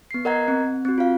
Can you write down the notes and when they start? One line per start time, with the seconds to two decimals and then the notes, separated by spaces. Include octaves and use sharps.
0.11 B3 C7
0.25 A#4 D#5 F#5 A#5 G#6
0.48 C4
0.85 C4 F#4
0.98 F4 F5